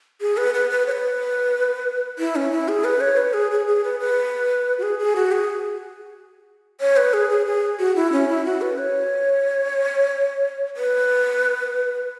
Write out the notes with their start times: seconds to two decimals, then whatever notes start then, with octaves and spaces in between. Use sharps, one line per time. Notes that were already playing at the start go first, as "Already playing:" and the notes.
0.21 G#4
0.37 B4
0.54 B4
0.70 B4
0.87 C#5
0.92 B4
2.19 E4
2.36 C#4
2.52 E4
2.68 G#4
2.84 B4
3.01 C#5
3.17 B4
3.34 G#4
3.51 G#4
3.66 G#4
3.84 B4
4.00 B4
4.78 F#4
4.83 G#4
4.99 G#4
5.16 F#4
5.32 G#4
6.81 C#5
6.97 B4
7.13 G#4
7.30 G#4
7.46 G#4
7.79 F#4
7.96 E4
8.12 C#4
8.29 E4
8.45 F#4
8.62 B4
8.78 C#5
10.77 B4